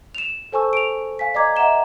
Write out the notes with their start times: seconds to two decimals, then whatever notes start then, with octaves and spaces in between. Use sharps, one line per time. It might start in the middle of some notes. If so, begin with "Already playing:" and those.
0.15 E7 F7
0.52 A4 C5 G#5 A5 C#6 E6
0.73 D7 F7
1.19 F5 G#5 B6
1.34 D5 D#5 A#5 D6 G#6
1.56 D#5 E5 F#5 A#5 E7 G7